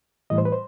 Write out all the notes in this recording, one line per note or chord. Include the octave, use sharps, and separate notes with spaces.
A2 E3 G3 D#5
C5
B4
C5